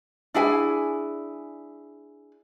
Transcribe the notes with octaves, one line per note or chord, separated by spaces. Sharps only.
D4 E4 G#4 G#5